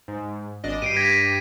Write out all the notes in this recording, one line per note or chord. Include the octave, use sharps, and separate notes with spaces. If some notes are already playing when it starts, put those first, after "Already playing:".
G#2
G#1 D4 D#5
G2 G4 C7 D7 D#7
G#6 A#6 B6